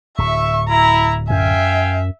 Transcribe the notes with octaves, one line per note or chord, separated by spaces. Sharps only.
D1 E5 C#6
E4 A#5
F#2 E5 F5 G5 G#5